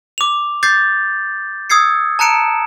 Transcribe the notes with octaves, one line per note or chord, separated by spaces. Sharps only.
D6 F7
D6 G6 A6 C7
D#6 E6 G#6 C7 C#7
A5 A#5 F#6 C#7 D7 E7